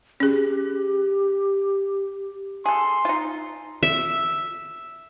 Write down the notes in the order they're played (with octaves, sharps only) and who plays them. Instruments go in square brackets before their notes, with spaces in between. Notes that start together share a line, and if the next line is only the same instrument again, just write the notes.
[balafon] C#4 G#4 [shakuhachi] G4
[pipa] G#4 A4 [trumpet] C6
[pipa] D#4 F4
[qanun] E5